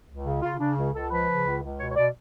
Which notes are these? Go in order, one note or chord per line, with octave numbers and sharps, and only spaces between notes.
C#2
C#3
C#3 F4
C#3 D4
C#2
C#2 A4
F3 B4
C#3
C#2
C#2
B2 C#5
C#5
B2 D5